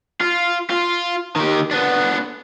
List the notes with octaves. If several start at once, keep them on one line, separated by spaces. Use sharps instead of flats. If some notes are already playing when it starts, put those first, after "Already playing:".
F4
F4
D#3 G4
B3 D4